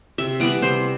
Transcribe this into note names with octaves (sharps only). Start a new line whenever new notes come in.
C3 E5
E3 G3 B3 D5
C3 C5